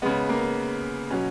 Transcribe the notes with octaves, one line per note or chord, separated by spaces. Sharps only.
C#3 G#3 B3
A#3
B2 F#3 C#4